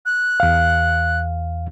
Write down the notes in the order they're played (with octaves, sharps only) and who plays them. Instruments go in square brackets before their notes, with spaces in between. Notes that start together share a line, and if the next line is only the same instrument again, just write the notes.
[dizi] F#6
[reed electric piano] E2 F5